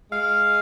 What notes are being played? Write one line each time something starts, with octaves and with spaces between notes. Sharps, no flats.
G#3 F5